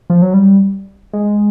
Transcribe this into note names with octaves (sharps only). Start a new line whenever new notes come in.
F3
F#3
G3
G#3